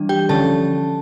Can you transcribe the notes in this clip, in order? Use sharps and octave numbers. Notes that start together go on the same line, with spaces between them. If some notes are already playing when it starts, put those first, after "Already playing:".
Already playing: E3 G3 D4
G4 G5
D3 F3 C#4 A4 A5